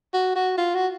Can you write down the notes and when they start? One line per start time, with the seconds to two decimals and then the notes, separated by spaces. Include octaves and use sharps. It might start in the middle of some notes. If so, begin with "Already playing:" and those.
0.14 F#4
0.36 F#4
0.58 F4
0.75 F#4